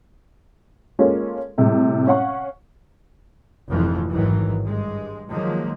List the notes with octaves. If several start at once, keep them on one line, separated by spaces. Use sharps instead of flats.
G#3 A#3 C#4 F4 A4
A2 C3 G3 G#3
C#4 F5 F#5 C#6
F1 F2 G#2 E3 F3
A1 G#2 D#3 E3 F#3
G2 G#3
D#3 F3 F#3 G#3 A#3